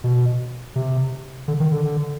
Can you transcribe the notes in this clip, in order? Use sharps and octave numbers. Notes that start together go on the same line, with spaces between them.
B2
C3
D3
D#3
D3